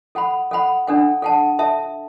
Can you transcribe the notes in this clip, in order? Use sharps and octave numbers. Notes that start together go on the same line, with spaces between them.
A4 F#5 B5
A4 F#5 B5
D4 A4 F#5
A4 F#5 A5
A4 E5 A5